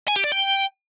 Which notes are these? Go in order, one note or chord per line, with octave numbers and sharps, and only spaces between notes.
G#5
G4
D5
G5